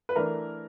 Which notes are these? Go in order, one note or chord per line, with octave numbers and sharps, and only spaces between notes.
B4
E3 A3 D4 A#4